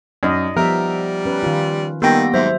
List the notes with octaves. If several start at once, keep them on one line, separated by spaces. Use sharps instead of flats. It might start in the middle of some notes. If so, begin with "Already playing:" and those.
F#2 D#4 D5 D#5
F3 G3 B3 A#4 E5
C#4 B4
D#3 F4
D#3 G3 A#3 B3 G4 G5 A#6
G#2 F#3 C5 E5